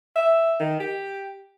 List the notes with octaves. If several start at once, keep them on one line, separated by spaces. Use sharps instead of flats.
E5
D#3
G4